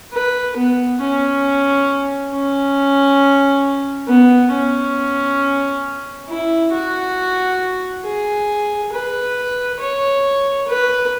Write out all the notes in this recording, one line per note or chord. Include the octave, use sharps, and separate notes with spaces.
B4
B3
C#4
C#4
B3
C#4
E4
F#4
G#4
B4
C#5
B4